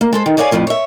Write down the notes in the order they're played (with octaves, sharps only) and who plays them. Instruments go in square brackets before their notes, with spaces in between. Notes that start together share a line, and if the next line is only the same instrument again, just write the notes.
[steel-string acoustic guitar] A#3
G#3 A4 C5
D#3
G#4 C#5 D5 F5 G5 G#5
F2 A2 F3 D4
C#5 E5